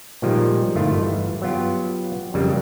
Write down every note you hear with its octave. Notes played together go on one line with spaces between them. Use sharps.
A#2 D#3 F3 G3 G#3
G1 D#3 A3 E4 F4
G1 E3
F#3 B3 F4 G4
F2 C#3 F#3 G3 A#3